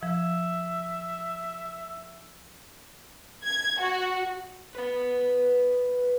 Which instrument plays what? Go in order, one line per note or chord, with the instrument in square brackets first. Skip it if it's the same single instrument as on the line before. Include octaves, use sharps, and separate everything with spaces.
[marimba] F3 [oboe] E5
[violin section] G#6
F#4
[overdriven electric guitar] B4 F#5